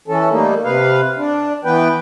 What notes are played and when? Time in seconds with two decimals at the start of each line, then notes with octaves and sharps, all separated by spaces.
0.08 E3 C#4 A4
0.30 G3 A3 A#3 D#4
0.65 C3 B4 F5
1.18 D4
1.65 E3 B3 B4 G5